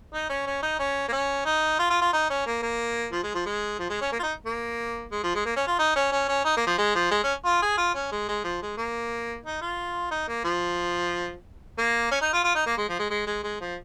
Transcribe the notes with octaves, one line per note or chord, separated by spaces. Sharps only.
D#4
C#4
C#4
D#4
C#4
A#3
C#4
D#4
F4
F4
F4
D#4
C#4
A#3
A#3
F3
G#3
F3
G#3
F3
G#3
C#4
A#3
F4
D#4
A#3
G#3
F3
G#3
A#3
C#4
F4
D#4
C#4
C#4
C#4
D#4
A#3
F3
G#3
F3
G#3
C#4
F4
G#4
F4
C#4
G#3
G#3
F3
G#3
A#3
D#4
F4
D#4
A#3
F3
A#3
C#4
D#4
F4
F4
D#4
A#3
G#3
F3
G#3
G#3
G#3
G#3
F3